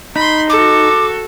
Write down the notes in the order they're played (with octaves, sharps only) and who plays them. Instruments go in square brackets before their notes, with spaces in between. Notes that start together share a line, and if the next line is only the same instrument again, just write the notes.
[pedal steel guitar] D#4 [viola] B5 C6
[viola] F#4 A4 [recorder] D6